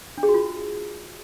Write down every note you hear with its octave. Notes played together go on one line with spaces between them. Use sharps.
D4
G#4
F#4
F4